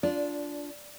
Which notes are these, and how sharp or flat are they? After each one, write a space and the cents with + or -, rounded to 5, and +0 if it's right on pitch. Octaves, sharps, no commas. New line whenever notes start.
D4 -15 F4 +0 D5 +0